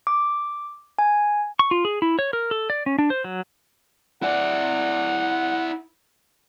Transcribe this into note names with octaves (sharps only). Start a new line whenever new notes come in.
D6
G#5
C#6
F4
G#4
E4
C#5
A#4
A4
D5
C#4
D4
C5
F#3
E4 D5 F#5